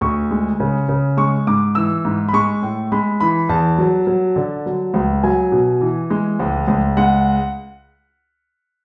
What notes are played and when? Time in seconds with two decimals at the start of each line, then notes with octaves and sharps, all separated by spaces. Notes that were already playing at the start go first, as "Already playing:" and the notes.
0.01 D2 C#6
0.31 G#3
0.60 C#3
0.89 C#3
1.17 G#3 C#6
1.47 G#2 D6
1.75 E3 E6
2.05 G#2
2.29 B5
2.33 G#3 C#6
2.62 A2
2.92 G#3 B5
3.20 E3 B5
3.49 E2 A5
3.78 F#3
4.07 F#3
4.36 D3
4.66 F#3
4.94 C#2
5.24 F#3 G#5
5.52 B2
5.81 E3
6.10 G#3
6.40 C#2
6.68 C#2
6.97 G#3 F#5